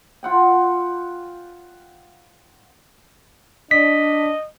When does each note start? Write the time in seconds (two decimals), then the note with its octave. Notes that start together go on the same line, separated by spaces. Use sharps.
0.23 F4 F#5 G5
3.71 D4 D#5 B6